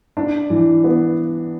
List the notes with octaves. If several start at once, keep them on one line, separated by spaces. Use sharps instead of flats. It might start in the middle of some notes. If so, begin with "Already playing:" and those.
D4
E3
B3